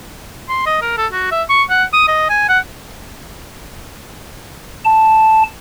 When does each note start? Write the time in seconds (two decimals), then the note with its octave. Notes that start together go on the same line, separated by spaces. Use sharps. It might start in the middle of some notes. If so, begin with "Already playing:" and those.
0.49 C6
0.66 D#5
0.82 A#4
0.98 A4
1.12 F#4
1.31 E5
1.49 C#6
1.70 F#5
1.93 D#6
2.08 D#5
2.29 G#5
2.49 F#5
4.85 A5